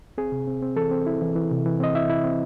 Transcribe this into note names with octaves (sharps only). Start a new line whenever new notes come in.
C4 G#4
C3
C4
C4
E3 A4
C4
E4
E3
E3
C3
E3
C4 D#5
E4 E5
E4
C4